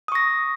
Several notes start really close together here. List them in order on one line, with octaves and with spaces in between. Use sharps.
D#6 C#6 A#6